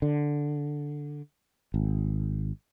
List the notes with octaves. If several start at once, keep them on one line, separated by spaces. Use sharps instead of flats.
D3
G#1